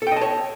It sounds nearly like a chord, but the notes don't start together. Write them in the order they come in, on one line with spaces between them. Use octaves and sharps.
A4 G5 D#5 A5 C#5